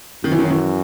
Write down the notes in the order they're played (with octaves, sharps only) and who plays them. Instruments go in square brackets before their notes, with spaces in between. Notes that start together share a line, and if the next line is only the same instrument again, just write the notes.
[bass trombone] F#2 [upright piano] D#3
[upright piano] E3
D#3
F#3
E3